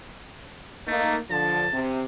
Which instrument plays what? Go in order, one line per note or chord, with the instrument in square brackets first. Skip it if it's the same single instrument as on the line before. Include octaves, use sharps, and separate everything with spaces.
[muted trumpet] A3 [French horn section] A#3 D#4
[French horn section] D3 F3 [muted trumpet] A5
[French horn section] C3